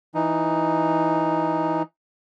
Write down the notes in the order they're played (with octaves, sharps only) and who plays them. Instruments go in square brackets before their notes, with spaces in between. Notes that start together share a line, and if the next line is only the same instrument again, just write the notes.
[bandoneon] E3 D#4